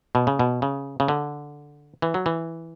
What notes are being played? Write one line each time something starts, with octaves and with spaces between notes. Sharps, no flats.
B2
C#3
B2
C#3
C#3
D3
E3
F#3
E3